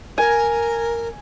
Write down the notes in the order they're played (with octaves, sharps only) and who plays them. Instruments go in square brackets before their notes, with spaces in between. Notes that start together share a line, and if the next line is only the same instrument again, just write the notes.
[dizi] A#4 [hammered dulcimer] G#5